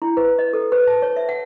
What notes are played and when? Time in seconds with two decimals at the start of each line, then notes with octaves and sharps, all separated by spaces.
0.02 E4
0.17 B4
0.39 D#5
0.53 A4
0.72 B4
0.87 A5
1.02 C#5
1.17 E5
1.29 F#5